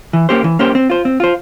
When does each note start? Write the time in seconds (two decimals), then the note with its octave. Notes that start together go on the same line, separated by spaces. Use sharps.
0.13 E3
0.29 A#3 C#4 G4 C5
0.44 E3
0.59 A#3 C#4 G4 C5
0.75 C4
0.90 F4 C5
1.05 C4
1.20 F4 C5